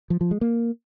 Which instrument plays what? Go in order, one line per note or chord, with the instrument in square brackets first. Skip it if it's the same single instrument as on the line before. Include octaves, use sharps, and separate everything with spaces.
[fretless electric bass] F3
F3
G#3
A#3